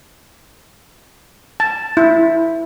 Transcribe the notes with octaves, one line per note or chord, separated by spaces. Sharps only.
A5
E4